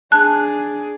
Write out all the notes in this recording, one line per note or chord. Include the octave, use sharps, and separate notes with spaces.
D4 G#4 A5 F#6